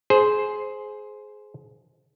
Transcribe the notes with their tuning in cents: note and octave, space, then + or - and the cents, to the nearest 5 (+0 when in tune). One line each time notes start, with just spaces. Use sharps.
G#4 +20 C5 +0